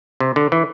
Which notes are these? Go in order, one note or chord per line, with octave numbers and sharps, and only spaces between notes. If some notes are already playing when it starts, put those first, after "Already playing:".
C3
D3
E3